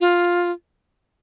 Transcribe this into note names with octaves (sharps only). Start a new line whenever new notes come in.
F4